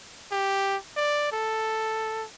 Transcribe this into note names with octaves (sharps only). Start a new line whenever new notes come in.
G4
D5
A4